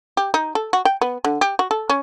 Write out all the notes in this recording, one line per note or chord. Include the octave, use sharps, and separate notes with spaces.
G4
D#4
A4
F#4
G5
B3
D3
G4
F#4
A4
C#4